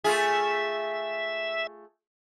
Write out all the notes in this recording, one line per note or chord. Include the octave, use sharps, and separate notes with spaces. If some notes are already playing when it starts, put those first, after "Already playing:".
A3 F4 G#4 E5